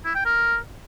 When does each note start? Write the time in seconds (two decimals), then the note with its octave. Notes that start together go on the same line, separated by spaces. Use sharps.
0.05 E4
0.15 G5
0.25 A#4